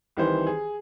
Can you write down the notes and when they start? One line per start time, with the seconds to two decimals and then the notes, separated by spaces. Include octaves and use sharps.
0.17 C2 D#3 E3 C5
0.47 G#4